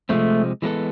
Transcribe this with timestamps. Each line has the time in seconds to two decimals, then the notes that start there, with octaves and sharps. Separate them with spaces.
0.09 C3 F3 G#3 A3 C4
0.62 E3 G#3 B3 E4 A4